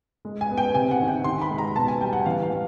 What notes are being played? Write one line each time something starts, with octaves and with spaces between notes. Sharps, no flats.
G#3
G#5
B3
G5
C3 G#5
F#5
D#3
G5
D#3 C6
B5
G#3
A#5
B2 A5
G#5
G3 G5
F#5
E3 F5
F5
G3